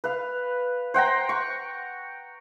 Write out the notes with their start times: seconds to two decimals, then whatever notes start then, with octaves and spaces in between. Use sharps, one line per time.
0.04 B4 F5
0.94 C5 F#5 G5 A#5
1.29 C#6